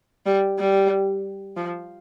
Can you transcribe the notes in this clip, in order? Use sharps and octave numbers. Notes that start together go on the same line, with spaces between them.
G3
G3
F3